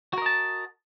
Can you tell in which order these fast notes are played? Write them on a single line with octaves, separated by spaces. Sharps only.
F#4 A#4 D#5 A5